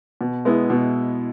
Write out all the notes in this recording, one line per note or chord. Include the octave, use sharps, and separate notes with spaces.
B2
G#3 B3 E4
B2